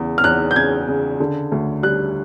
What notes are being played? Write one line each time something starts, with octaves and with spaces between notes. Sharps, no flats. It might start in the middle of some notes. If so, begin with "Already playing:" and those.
Already playing: E2 C#3
F6
E2 F#6
G6
C#3 G#6
C#3
D3
D2
G3 F#6